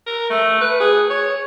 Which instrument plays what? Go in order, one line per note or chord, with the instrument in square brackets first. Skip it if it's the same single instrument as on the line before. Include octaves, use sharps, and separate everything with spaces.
[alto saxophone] A#4
A3
B4
G#4
C#5